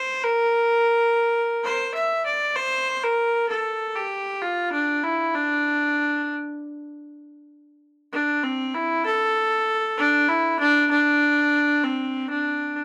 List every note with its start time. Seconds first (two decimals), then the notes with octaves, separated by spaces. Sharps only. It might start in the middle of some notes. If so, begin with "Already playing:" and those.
Already playing: C5
0.24 A#4
1.64 C5
1.94 E5
2.26 D5
2.56 C5
3.03 A#4
3.49 A4
3.95 G4
4.41 F4
4.72 D4
5.03 E4
5.35 D4
8.13 D4
8.43 C4
8.74 E4
9.05 A4
9.98 D4
10.29 E4
10.59 D4
10.91 D4
11.84 C4
12.30 D4